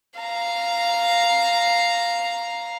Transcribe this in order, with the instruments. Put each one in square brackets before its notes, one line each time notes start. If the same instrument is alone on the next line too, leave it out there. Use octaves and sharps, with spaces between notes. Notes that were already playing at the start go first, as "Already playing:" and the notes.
[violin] F5 A#5